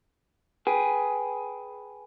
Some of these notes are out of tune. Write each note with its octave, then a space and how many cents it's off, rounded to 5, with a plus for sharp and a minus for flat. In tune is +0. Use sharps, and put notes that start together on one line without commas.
G#4 +10 B4 +0 G5 +0